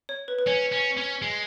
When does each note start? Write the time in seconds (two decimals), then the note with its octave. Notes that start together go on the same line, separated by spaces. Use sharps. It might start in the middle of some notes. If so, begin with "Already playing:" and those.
0.09 C#5
0.28 B4
0.39 B4
0.47 C#4 C#5
0.72 C#4
0.97 C#4
1.22 G#3